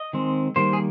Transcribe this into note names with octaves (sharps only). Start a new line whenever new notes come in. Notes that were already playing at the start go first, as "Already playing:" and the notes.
Already playing: D#5
D#3 G#3 C4
D#3 G3 A#3 C5
G#4